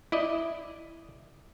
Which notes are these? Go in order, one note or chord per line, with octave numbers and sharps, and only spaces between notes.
E4 D5 D#5